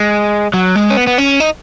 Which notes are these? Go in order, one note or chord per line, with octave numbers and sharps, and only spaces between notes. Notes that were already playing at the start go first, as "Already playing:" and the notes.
Already playing: G#3
F#3
G#3
C#4
B3
B3
C#4
D#4